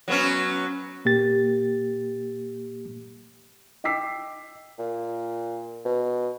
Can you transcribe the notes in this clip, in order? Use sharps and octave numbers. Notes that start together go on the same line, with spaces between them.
F#3 B3 C#4
A#2 A#3 G4 A6
D#5 G5 D6 E6 B6 C7
A#2
B2